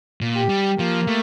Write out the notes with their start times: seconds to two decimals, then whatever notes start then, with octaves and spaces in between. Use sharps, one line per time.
0.21 A#2
0.35 G4
0.49 G3
0.78 F3 A#3
1.07 A3